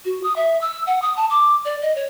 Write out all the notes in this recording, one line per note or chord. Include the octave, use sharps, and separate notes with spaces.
F#4
D#6
E5
E6
F#5
D#6
A5
D6
D5
D#5
C#5